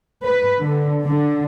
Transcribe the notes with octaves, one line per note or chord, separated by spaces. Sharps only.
B4
D3
D3